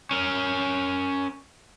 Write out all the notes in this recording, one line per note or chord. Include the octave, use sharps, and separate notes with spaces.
C#4 A#4